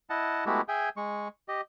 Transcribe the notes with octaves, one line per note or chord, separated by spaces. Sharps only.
E4 D#5 F#5 A5
G#3 A3 B3 E4 F#4 G4
G#4 E5 G5 G#5
G#3 C#6
G4 D#5